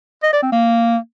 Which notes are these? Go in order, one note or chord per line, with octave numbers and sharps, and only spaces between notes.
D#5
D5
C4
A#3